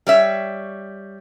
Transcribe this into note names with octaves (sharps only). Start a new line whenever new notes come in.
G3 C#5 E5